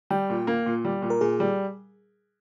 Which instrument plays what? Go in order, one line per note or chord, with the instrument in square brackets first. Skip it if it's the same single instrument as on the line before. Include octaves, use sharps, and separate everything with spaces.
[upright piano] G3 [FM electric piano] G5
[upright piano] A#2
A#3
A#2
G3
A#2
[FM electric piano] A#4
[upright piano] A#2 [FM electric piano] G#4
[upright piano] G3